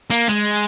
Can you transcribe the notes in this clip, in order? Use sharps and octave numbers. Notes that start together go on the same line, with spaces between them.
A#3
G#3